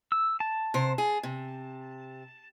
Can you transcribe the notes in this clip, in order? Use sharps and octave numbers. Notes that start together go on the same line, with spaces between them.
E6
A5
C3 C5
G#4
C3